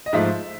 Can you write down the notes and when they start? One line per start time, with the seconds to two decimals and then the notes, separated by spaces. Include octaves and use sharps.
0.06 D#5
0.13 G#2 F3 A3 E5